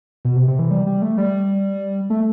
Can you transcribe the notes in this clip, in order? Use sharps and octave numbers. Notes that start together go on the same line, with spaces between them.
B2
C3
C3
E3
G3
G3
A3
G3
A3